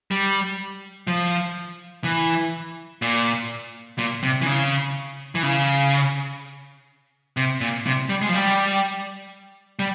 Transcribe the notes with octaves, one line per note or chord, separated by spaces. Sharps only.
G3
F3
E3
A#2
A#2
C3
E3
C#3
E3
C#3
C3
A#2
C3
G3
G#3
F3
G3
G3